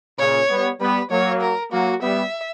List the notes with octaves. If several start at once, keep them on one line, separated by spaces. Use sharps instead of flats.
A#2 C#3 C#5
G3 B3
G3 B3 B4
F#3 A#3 C#5
A#4
F#3 A#3 F#4
G3 B3 E5